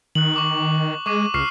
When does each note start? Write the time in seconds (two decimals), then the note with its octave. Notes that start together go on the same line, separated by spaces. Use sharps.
0.15 D#3 F#6 F#7
0.34 C#6 D6 F#7
1.06 G#3 C#6 D6 D#7
1.34 C#2 C#6 F6 C7